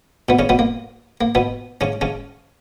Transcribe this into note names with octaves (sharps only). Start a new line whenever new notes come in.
B2 B3
C#3 C#4
B2 B3
A#3
A#3
B2 B3
C#3 C#4
C#3 C#4